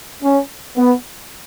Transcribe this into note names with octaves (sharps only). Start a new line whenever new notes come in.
C#4
B3